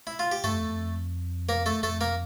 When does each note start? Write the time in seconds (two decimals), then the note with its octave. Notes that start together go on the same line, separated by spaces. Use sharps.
0.07 E4
0.19 F4
0.32 G4
0.44 G2 A3 A4
0.53 F2
0.62 E2
0.72 F2
1.49 A#3 A#4
1.66 A3 A4
1.83 F2 A3 A4
2.01 A#3 A#4